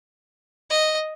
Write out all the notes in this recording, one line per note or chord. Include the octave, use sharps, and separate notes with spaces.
D#5